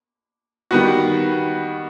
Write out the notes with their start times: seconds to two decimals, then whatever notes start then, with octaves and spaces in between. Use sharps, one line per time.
0.71 D#3 G3 B3 F#4